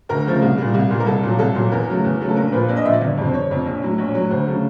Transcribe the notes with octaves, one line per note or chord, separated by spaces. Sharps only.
D2 A#4
C#3 F3 A3
C2
A#2 G3
C2
A#2 G3
A#4
C2 A4
A#2 F#3
C2 A4
A#2 F#3
E2 A#4
C#3 F#3 A3
E2
C#3 F#3 A3
A4
A#1 A#4
A#2 F3 B4
A#1 D5
D#5
A#2 F3 E5
D5
G1
F2 C3
C5
G1 C#5
F2 C3
A#1
A2 F#3
A#1 C#5
A2 F#3
D2 C5
C#3 F#3 A3